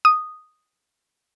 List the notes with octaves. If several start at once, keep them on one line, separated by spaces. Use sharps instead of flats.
D#6